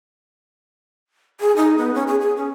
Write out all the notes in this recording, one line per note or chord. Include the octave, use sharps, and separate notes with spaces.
G#4
D#4
B3
C#4
G#4
G#4
C#4